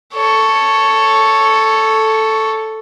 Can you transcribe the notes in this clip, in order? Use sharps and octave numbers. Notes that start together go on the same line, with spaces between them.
A4 C#5